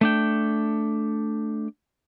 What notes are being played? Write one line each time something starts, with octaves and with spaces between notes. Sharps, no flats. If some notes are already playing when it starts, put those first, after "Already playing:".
A3 D4 G5